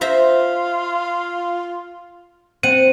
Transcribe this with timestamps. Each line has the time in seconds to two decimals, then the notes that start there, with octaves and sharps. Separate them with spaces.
0.01 F4 C5 E5 A#5
2.63 C4 F#5 D#7